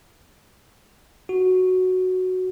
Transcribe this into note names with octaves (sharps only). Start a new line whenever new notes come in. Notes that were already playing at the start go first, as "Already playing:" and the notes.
F#4